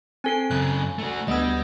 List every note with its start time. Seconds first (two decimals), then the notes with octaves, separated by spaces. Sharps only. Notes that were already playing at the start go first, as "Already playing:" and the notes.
0.24 C4 A4 G#5 C7
0.51 F#2 C#3 G#5 F#6
0.99 A3 F#4
1.28 D2 G3 B3 D#5 E6 G#6